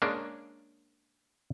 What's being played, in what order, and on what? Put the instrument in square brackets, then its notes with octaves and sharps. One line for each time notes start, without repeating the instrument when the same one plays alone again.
[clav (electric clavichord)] G#3 A#3 C#4 D4